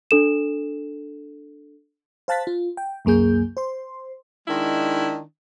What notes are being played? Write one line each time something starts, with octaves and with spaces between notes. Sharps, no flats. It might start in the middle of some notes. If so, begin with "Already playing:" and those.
D4 A4 E7
C5 F5 A5 F#6 A6 B6
F4
G5
C2 F#2 A#3 G#4 G6
C5 C6
D#3 G#3 D4 E4